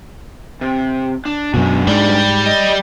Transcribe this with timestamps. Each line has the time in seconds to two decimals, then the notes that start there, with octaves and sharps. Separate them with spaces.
0.61 C3
1.25 D4
1.54 F#2 B2 G#3 D4 F#4
1.87 G#2 G3 D5
2.46 D#5